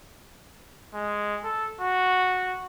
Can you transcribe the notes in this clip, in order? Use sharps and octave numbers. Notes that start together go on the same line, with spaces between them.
G#3
A4
F#4